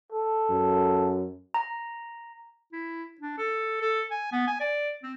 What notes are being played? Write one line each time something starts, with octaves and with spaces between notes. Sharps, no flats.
A4
F#2
A#5
E4
D4
A4
A4
G#5
B3
G#5
D5
C4